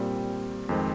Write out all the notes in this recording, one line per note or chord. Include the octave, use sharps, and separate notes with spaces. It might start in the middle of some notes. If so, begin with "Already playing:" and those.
Already playing: A#2 G3 C4
F2 D#3 G#3 C4